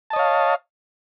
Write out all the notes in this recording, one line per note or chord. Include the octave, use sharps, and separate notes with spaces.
C#5 D#5 F5 A5